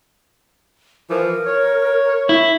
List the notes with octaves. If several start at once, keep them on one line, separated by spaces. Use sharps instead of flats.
E3 F3 A#4
C#5
E4